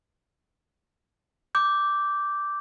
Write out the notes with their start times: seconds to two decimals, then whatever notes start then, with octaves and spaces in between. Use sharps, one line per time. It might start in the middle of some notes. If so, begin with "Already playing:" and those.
1.55 D6 G6